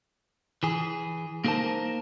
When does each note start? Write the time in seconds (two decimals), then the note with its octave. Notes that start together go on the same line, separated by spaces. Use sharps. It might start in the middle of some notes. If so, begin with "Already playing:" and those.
0.63 E3 G#4
1.44 A#3 D#4 G#4 A#4 C5 A5